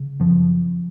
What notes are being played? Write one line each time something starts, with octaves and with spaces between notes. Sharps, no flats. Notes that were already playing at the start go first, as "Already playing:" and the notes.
Already playing: C#3
F#2 F3